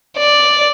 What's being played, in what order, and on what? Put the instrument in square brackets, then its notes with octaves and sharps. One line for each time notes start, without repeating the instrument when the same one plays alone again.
[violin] D5